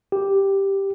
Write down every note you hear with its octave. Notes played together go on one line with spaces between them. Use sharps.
G4